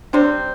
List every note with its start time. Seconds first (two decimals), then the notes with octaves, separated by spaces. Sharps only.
0.13 C3 G3 C4 D4